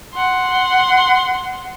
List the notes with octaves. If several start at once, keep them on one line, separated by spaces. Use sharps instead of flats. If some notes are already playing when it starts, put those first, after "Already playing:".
F#5 C6